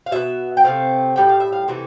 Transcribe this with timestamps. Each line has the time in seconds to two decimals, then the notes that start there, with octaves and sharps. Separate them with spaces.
0.06 F5
0.11 B2 B3 E5
0.57 G5
0.64 C3 F3 A3 C4 F5
1.16 A2 G3 G5
1.29 F5
1.40 E5
1.52 F5
1.68 C3 E3 A3 E5